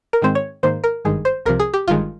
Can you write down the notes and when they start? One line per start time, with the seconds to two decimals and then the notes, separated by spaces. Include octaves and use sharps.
0.13 A#4
0.22 G#2 D#3 G#3 C4 C5
0.35 C#5
0.63 G#2 D#3 A#3 C5
0.84 A#4
1.05 G#1 G2 D#3 G#3 G#4
1.25 C5
1.46 C2 C3 F3 A#4
1.60 G#4
1.74 G4
1.87 G1 G2 D#3 G#3 F4